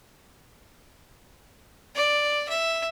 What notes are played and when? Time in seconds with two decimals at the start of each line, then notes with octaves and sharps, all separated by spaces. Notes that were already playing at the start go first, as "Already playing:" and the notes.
1.95 D5
2.49 E5